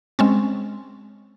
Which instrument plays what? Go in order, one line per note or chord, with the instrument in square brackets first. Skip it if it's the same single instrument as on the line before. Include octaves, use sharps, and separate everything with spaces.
[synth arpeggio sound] G#3 C4 C#4